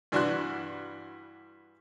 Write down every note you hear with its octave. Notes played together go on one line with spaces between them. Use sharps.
G2 E3 D4 F#4 C6 F#6